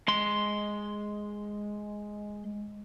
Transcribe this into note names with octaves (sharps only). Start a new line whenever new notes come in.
G#3 C6